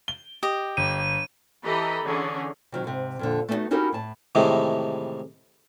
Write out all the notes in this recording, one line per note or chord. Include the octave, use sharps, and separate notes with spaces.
G7
G4 D#5
G1 D#7
E3 G4 A4 D#5 A#5 B5
D3 E3 C#4 G#4
C3 D#3 F#3
G#2 C3
F2 A#2 D3
A3 B3 C4 D4 D#4 F#4
C#4 D#4 E4 F#4 G4 A#4
A2 A5
A2 C3 D#3 E3 G#3 A3